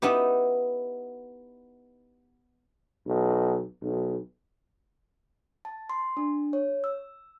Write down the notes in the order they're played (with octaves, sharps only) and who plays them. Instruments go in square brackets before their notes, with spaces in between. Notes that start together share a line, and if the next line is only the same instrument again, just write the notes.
[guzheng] B3 D#4 E4 G4
[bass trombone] B1
B1
[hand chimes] A5
C6
D4
C#5
E6